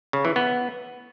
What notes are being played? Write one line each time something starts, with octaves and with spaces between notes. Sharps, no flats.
C#3
E3
B3